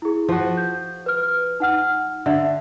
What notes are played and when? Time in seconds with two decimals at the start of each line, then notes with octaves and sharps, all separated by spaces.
0.02 E4 G#4
0.29 F3 F#4
0.57 G6
1.06 B4 F6
1.60 D#4 F#5 F6
2.26 D3 E5